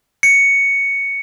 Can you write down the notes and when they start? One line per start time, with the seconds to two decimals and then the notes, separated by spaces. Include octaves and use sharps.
0.23 C#7